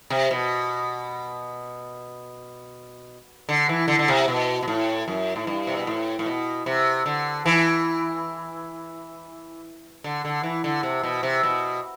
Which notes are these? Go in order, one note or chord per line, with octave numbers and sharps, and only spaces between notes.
C3
B2
D3
E3
D3
D3
C3
B2
B2
A2
F#2
A2
G2
C3
B2
A2
A2
B2
C3
D3
E3
D3
D3
E3
D3
C3
B2
C3
B2